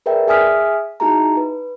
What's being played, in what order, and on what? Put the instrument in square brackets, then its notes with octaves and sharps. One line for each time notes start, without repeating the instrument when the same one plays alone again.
[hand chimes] G#4 A#4 B4 D5 E5 G5
G#4 E5 G#5 D#6 F6 B6
D#4 E4 F#4 G#4 A5 A#5
B4